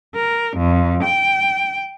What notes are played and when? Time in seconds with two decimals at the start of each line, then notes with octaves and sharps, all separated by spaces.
0.15 A#4
0.57 F2
1.03 G5